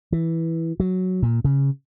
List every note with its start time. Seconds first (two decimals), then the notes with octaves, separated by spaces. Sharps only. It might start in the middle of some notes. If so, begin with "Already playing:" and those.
0.12 E3
0.80 F#3
1.22 A#2
1.45 C#3